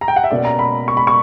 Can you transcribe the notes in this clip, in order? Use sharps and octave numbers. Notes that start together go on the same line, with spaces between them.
A#5
G5
F#5
E5
B2 A#3 C#4 D5
A#5
B5
C#6
B5
C#6